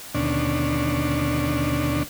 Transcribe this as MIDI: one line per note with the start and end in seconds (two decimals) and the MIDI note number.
0.15 2.03 39
0.15 2.03 47
0.15 2.03 50
0.15 2.03 61
0.15 2.03 62